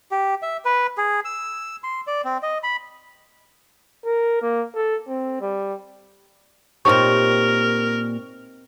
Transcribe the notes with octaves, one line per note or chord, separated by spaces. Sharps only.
G4
E5
B4
G#4
E6
C6
D5
C4
D#5
B5
A#4
A#3
A4
C4
G3
A#2 C4 D#4 G4 A#4 C#5 C#6